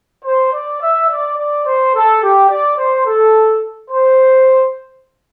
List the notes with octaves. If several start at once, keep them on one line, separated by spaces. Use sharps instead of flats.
C5
D5
E5
D5
D5
C5
A4
G4
D5
C5
A4
C5